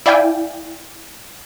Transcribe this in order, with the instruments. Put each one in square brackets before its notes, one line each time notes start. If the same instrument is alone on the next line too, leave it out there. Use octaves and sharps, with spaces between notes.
[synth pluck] E4 D5 F5 G5 G#5